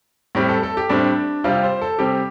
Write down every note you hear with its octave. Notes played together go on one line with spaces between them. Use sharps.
A2 G3 C4 G4
A4
A4
G4
A2 G3 C4 D4
C3 G3 C4 F4
C5
A4
C3 G3 C4 G4